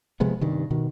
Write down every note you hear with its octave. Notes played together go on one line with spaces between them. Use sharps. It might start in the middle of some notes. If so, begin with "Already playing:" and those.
C3 F3 G#3 B3
G2 C3 D#3
B2 D#3